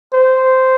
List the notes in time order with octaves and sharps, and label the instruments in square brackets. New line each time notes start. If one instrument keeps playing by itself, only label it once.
[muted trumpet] C5